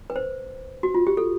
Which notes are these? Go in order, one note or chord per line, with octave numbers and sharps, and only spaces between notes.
B4
C5
F#4
F4
G4
A4